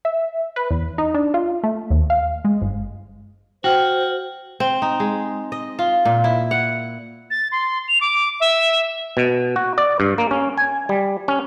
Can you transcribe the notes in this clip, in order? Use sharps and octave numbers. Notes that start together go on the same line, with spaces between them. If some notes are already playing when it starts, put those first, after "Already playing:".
E5
B4
E2
D#4
D4
F4
A3
D#2
F5
G#3
G1
F#4 C5 G5 F6
C4
D#4
G#3
D#5
F4
A#2
E4
F#5
A6
C6
F7
D6
E5
B2
F#4
D5
G2
A#3
C#4
G#5
G3
C#4